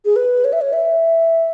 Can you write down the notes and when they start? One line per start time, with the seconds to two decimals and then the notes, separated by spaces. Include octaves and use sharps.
0.05 G#4
0.16 B4
0.44 C#5
0.53 E5
0.61 C#5
0.73 E5